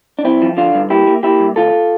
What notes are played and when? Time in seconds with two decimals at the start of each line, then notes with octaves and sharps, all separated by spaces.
0.19 D4
0.24 G2 C4 E4
0.42 F3
0.57 D3 D4 F4
0.75 G2
0.90 A#3 E4 G4
1.07 A#3
1.23 A#3 E4 G4
1.40 G2
1.56 D2 F4 A4